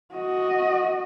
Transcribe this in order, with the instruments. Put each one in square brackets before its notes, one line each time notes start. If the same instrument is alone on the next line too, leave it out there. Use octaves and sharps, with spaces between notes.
[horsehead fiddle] F#4 D#5